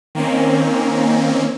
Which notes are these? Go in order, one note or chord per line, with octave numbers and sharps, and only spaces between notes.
D#3 A#3 C4 C#4